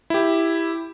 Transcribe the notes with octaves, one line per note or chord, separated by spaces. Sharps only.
E4 G4